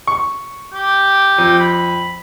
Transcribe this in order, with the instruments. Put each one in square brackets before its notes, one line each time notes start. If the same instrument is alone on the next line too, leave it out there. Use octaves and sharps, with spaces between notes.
[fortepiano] C#6
[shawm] G4
[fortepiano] F2
[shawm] B5